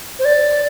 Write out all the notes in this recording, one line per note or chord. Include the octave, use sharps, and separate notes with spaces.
C5
D5